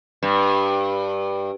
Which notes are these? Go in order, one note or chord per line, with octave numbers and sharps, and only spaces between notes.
G2